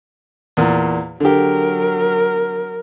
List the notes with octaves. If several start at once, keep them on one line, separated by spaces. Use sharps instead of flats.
E2 A#2
D3 F#3 G4 A#4